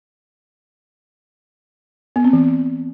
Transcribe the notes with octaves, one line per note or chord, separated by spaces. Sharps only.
B3
C4
E3